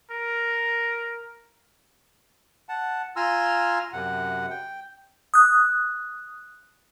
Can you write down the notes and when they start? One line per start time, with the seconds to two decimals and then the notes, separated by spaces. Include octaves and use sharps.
0.11 A#4
2.69 F#5 A5
3.16 F4 G#5 A#5 C6 E6 F6
3.93 F#2 C3 F#5
4.50 G5
5.34 D#6 F#6